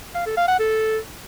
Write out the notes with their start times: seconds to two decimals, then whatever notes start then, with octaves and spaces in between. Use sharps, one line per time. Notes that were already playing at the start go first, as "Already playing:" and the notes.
0.15 F5
0.26 A4
0.37 F5
0.48 F#5
0.59 A4